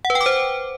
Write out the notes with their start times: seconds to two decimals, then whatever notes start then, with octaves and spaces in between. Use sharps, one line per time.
0.05 F#5
0.10 B4
0.15 G5
0.21 D6
0.26 C5